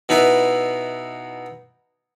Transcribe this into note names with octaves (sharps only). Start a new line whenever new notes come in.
B2 D#4 E4 B4